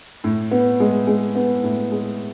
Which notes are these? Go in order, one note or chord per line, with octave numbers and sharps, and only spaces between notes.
A2
B3
G#3
G#3
B3
A2
G#3